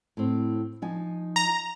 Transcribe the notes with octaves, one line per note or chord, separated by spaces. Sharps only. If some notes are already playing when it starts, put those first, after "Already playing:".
A2 C4
F3 D#4 G#5
A#5